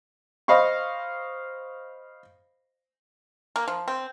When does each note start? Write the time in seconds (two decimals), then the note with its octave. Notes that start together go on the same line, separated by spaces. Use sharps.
0.48 C5 D#5 F5 B5 C#6
3.56 A#3
3.68 F3
3.88 C4